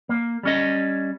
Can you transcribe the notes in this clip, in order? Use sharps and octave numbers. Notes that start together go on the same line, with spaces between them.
A#3
G3 C#4 D#5